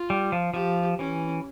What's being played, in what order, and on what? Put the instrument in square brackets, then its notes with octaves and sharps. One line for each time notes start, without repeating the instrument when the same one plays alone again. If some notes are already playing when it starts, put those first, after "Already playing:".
Already playing: [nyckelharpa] F4
[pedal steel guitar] G3
F3
[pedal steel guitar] F3 [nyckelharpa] G4
[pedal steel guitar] E3 [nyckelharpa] C#4